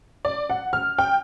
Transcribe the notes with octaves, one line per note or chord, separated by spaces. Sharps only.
D5
F#5
F6
G5